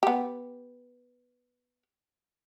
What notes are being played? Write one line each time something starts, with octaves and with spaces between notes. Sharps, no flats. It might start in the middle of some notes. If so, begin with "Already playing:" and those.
B3 G4